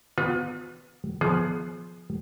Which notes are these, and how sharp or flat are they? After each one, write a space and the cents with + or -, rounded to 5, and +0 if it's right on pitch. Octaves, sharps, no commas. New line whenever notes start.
B3 +15 F4 +40 B4 +0
F3 +0 B3 +0 G#4 +20